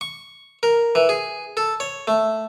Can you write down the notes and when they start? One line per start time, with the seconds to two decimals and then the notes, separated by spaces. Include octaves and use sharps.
0.01 C#6
0.63 A#4
0.95 E3
1.09 G#4
1.57 A4
1.80 C#5
2.07 A3